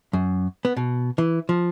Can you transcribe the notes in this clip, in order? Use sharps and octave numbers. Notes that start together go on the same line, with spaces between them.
F#2
B3
B2
E3
F3